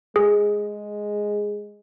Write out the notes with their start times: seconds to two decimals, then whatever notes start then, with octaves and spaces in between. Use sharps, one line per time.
0.16 G#3 G#4